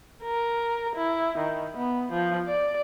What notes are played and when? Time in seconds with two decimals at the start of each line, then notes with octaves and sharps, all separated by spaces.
0.22 A#4
0.95 E4
1.38 D#3
1.77 B3
2.12 F3
2.47 D5